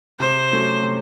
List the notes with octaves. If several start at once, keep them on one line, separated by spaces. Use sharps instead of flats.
C3 C5
F#3 A3 C#4
C3